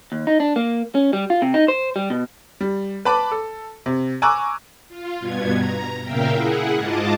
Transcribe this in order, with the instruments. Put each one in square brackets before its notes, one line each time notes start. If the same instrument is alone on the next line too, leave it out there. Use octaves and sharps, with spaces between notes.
[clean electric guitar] D#2
D#4
D4
A#3
C#4
G3
F4
C3
D#4
C5
G3
B2
[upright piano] G3
B4 A5 B5 D6
A4
C3
G#5 A#5 C#6 D6 E6 F#6
[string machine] F4
G2 B2 B3 G#6
A#5
A#2 C#3 A#4 E5 F5 G5
E4 G#4 F#5
G#2 F4 D#5 A5 D6